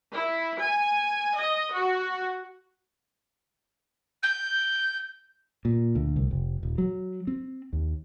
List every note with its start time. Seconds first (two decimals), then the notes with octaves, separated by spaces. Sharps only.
0.14 E4
0.60 G#5
1.37 D#5
1.72 F#4
4.23 G6
5.65 A#2
5.95 D2
6.16 C2
6.31 F1
6.63 D#1
6.78 F#3
7.27 C4
7.73 D#2